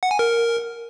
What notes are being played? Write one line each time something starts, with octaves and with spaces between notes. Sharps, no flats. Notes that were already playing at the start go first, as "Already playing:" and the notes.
F#5
G#5
A#4